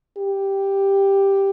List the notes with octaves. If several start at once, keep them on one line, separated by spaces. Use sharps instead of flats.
G4